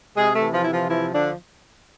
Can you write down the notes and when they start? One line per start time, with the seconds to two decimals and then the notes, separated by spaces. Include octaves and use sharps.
0.17 C3 G#3 G#4
0.35 A3 A4
0.41 E3
0.53 F3 F4
0.63 C3 E4
0.71 F3 F4
0.89 E3 F3 E4
1.13 D3 F3 D4